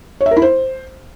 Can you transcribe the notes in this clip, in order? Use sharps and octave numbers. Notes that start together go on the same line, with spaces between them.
C#5
E5
A#4
E4
C5